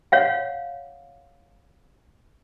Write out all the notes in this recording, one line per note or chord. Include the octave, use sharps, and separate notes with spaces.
C#5 F5 F#5